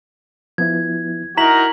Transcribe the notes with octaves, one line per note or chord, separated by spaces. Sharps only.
F3 B3 E4 G#6
D#4 E4 F#4 A#4 A#5 B6 F#7